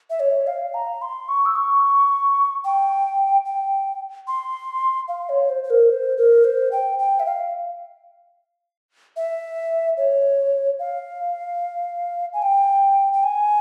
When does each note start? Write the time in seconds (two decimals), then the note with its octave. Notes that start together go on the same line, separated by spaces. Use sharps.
0.10 E5
0.20 C#5
0.47 F5
0.74 A#5
1.02 C6
1.28 C#6
1.46 E6
1.56 C#6
2.64 G5
3.45 G5
4.27 C6
5.08 F5
5.29 C#5
5.49 C5
5.64 C5
5.70 A#4
5.90 C5
6.17 A#4
6.44 C5
6.72 G5
6.99 G5
7.20 E5
7.26 F5
9.16 E5
9.97 C#5
10.79 F5
12.33 G#5
12.42 G5
13.13 G5
13.23 G#5